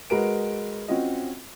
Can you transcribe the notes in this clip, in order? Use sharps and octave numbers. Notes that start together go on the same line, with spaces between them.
G#3 F#4 A#4 B4 D7
C4 C#4 F4 F#4 D#5